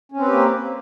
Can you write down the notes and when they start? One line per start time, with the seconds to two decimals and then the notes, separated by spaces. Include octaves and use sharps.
0.12 C#4
0.17 C4
0.22 B4
0.27 G4
0.32 A#3